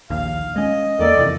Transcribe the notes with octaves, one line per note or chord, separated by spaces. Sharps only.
A#1 D#2 F5
G#3 C#4 D#5
E2 D#3 A#3 A4 D5
F2 C3 E3